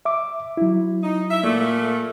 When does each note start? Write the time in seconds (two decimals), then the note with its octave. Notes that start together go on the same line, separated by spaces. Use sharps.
0.05 E5 D6
0.57 F#3 E4
1.03 D#4
1.31 E5
1.43 A#2 A3 A#3